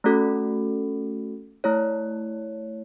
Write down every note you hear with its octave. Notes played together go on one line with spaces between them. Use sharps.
A3 C#4 F#4 A4
A3 E4 C#5